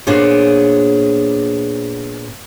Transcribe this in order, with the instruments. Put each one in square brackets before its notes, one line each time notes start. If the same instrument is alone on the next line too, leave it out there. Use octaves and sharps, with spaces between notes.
[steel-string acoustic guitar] A#2 B3 D4 G#4 C5 C#5